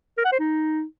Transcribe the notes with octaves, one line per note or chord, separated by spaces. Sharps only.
A#4
F#5
C5
D#4